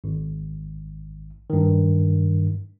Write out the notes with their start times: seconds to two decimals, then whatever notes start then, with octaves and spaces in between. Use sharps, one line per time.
0.04 G#1
1.50 G2 D#3